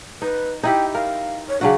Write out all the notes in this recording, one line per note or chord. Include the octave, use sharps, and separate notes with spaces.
D#4 B4
D#4 E4 G4 G5
A#4 F5
C#5
C#3 F#3 D4 F#4